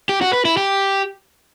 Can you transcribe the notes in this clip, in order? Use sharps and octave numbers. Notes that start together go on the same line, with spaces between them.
G4
F#4
B4
E4
G4